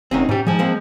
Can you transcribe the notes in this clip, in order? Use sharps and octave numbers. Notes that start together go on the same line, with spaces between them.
F1 C4 C#4 D#4
G#2 C#4 G4
G#2 F3 G#4
G#3 A#3 C4